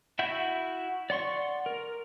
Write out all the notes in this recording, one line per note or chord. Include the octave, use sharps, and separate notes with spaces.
E4 F#4 E5 F#5 G6
D5 F#5 C6 C#6
A#4